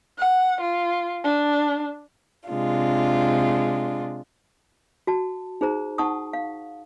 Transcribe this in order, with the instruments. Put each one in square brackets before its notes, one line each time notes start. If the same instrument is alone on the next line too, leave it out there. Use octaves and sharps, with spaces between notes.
[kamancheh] F#5
F4
D4
[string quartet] C3 G#3 D4 F4
[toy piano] F#4 A5
D#4 G#4 C5 A#5
D#4 F#5 A5 C#6 D#6
F5